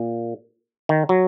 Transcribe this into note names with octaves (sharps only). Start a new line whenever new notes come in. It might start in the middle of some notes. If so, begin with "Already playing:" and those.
Already playing: A#2
D#3
F#3